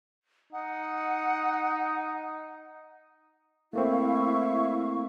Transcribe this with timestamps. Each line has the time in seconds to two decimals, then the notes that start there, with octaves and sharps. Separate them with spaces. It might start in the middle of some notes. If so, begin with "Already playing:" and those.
0.53 D#4 F#5
3.73 A3 A#3 C4 E4 F5 C#6